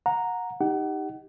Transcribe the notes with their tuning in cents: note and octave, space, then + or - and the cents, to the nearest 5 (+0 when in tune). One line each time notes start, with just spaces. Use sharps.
F#5 -25 A#5 +0
D#4 +0 G4 +0 F#5 +30